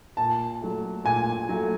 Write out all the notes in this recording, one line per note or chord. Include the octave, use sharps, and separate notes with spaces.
A#2 A5
F#3 A3
A#2 G#5
F#3 A3